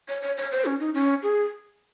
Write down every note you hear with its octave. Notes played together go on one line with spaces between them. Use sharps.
C#5
C#5
C#5
C5
C#4
D#4
C#4
G#4